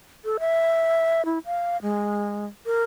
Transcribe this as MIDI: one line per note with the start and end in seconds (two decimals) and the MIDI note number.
0.25 0.37 69
0.40 1.25 76
1.25 1.39 64
1.46 1.77 77
1.82 2.45 56
2.66 2.83 70